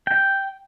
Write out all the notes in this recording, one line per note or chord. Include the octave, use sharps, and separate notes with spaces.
G5